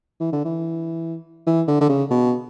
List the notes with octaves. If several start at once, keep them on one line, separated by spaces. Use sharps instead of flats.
E3
D3
E3
E3
D3
D3
C#3
B2